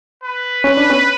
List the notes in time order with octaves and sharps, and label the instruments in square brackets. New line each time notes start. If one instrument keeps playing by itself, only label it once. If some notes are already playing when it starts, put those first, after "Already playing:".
[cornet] B4
[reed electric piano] C#4
D4
B3 C#4